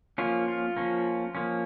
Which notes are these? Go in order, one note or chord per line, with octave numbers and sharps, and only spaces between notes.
F3 A#3 C#4 F4
F4
F3 A#3 C#4
F3 A#3 C#4